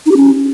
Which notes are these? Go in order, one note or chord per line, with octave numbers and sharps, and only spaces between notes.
D#4
G4
C#4